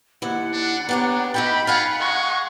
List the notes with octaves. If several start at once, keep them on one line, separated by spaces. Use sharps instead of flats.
D#2 E4 F#5
D4
B3 D4 G4 C#5 A#5
D#4 G4 E5 G5 B5
F4 F5 F#5 G#5 A5
G#3 C#6